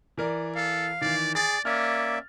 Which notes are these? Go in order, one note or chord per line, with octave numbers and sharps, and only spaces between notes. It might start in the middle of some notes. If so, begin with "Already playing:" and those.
E3 A#4 D5
A4 F5
D#3 E3 D5
G#4 D5 A6
A#3 C#4 D5 E5 F6